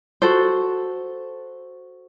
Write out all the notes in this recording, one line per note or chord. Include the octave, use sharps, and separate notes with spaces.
F#4 A4 C5